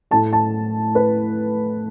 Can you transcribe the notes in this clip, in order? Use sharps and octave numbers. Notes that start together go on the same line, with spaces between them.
A2 A3 A5
A5
B4